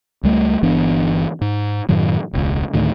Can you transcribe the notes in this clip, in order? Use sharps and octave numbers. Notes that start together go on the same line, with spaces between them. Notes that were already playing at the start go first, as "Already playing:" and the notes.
C#2 G3 A3
G1 E3 B3 D4
G#2
F#2 A2 D#3 F#3
E1 C#2
D2 A2 D#3